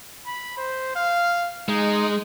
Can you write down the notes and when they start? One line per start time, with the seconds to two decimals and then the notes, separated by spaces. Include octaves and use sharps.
0.27 B5
0.57 C5
0.96 F5
1.69 G#3 D#4